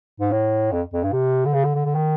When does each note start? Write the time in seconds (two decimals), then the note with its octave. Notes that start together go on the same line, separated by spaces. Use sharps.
0.20 G#2
0.32 A2
0.72 F2
0.93 F2
1.04 G2
1.13 C3
1.46 D3
1.54 C#3
1.65 D3
1.75 D3
1.85 D3
1.95 D#3